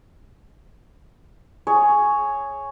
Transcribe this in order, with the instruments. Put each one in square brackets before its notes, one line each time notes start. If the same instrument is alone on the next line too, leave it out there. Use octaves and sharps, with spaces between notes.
[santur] G#4 C#5